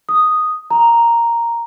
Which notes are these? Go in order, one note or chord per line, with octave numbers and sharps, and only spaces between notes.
D#6
A#5